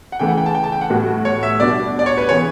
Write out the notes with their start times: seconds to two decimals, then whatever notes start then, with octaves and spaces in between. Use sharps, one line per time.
0.12 F#5
0.19 C#3 E3 A3 G5
0.28 F#5
0.38 G5
0.46 A5
0.55 G5
0.64 A5
0.72 G5
0.81 F#5
0.90 A2 G3 B3 F#4
1.25 C#5
1.43 E5
1.60 B2 G3 D4 F#4 D5
1.99 D5
2.06 C#5
2.17 B4
2.29 C#3 E3 B3 C#5